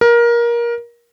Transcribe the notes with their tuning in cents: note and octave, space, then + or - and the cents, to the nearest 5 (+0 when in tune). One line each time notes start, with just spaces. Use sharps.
A#4 +20